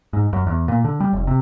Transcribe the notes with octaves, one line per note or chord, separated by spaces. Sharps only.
G#2
F#2
E2
A#2
D3
G3
F1
C3